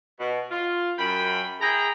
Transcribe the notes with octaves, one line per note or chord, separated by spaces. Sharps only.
B2
F4
F#2 G5 B5
E4 G#4 G5 A#5